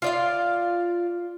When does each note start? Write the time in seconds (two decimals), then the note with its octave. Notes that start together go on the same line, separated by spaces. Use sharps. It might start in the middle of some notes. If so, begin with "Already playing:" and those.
0.02 F4 D5 F5